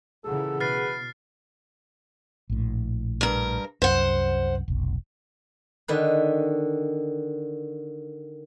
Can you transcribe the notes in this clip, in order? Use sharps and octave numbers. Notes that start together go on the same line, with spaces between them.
A#2 C#3 E3 G#4 A4 F#5
B2 B4 F6 A6 C7
A#1 A2
G2 A#4
C2 F#2 C5 F#5
F1 B1
D3 D#3 B4